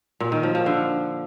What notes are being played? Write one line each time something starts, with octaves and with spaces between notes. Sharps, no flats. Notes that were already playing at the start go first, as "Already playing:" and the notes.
A#2
D#3
F3
F3
D3